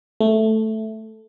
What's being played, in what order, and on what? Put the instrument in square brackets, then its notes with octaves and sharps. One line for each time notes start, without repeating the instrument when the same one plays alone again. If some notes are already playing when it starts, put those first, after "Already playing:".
[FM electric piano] A3